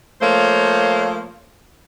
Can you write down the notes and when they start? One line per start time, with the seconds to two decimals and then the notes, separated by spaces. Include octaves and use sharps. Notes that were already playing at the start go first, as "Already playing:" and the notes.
0.21 F3 A3 A#3 C5 C#5